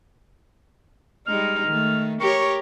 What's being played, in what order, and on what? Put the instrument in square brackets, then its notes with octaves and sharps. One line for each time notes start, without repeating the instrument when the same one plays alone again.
[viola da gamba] G3 G#3 D#4 [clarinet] F6
[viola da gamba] D#3 A3
[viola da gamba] G4 A#4 C#5 [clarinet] C#6